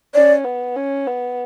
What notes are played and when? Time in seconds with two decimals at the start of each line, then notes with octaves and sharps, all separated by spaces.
0.14 C#4 D5
0.45 B3
0.76 C#4
1.07 B3